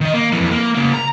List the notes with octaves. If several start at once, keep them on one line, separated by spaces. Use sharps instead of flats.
D#3 D#5
A#3
F2 E3
A#3
C#3 A#3
A#5